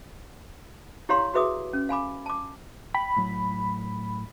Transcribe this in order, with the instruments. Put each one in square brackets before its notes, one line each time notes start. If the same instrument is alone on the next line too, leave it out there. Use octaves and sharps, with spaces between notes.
[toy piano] E4 G4 C#5 F5 A#5 C6
F#4 G#4 B4 E5 D6 D#6
C#4
F5 G#5 B5 D6
A5 D6
[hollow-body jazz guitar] G5 [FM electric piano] B5
[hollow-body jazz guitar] A2 F#3